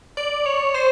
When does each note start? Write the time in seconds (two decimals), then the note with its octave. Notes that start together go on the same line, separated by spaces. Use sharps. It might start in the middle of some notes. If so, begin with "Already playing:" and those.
0.17 D5
0.46 C#5
0.74 C5